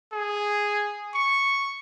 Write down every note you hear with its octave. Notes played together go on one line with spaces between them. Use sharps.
G#4
C#6